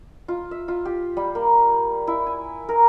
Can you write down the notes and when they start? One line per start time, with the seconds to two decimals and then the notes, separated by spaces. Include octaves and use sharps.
0.28 F4
0.51 E5
0.68 F4
0.85 G4
1.17 G3
1.35 A#3
2.07 E4
2.26 G#5
2.69 A#4